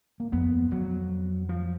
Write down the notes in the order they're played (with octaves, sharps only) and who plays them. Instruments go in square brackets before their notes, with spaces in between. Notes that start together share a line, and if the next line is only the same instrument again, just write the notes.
[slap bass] A#3
[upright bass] F2 [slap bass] B3
[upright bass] F2 [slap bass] F#3
[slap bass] F3